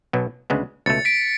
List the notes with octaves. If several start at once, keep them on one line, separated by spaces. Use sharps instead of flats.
B1 B2 F#3
D2 C#3 G#3 B3
C#2 B2 A3 A6 C#7
B6 D7